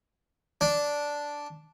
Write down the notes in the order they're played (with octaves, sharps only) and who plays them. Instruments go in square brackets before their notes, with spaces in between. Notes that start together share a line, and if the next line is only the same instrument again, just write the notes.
[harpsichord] D4